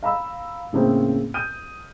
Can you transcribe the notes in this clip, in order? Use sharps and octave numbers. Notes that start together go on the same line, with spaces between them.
F5 A#5 B5 E6
A2 C#3 A#3 C4
D#6 F6 G6 D#7